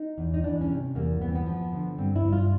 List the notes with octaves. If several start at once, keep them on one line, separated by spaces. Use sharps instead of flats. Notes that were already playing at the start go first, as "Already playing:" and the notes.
Already playing: D#4
E2
D#4
E3 D4
C#4
C3
E2 A#3
E2 B3
C4
B3
F3
D3
G2 C4
E4
G2
F4